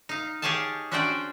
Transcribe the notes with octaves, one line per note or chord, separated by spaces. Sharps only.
D#4 F5
G4 G#4 C#5 F5 G#5 A5
C#4 D4 F#4 C5 D5 G5